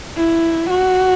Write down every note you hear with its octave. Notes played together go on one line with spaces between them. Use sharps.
E4
F#4